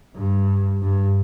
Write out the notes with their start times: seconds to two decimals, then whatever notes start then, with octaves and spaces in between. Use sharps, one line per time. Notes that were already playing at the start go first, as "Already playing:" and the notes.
0.16 G2
0.82 G2